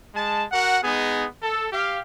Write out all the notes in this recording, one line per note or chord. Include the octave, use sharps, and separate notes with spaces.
G#3 A5
F#4 A#4 F#5
G#3 B3 D#4 G#4
A4
G4 F5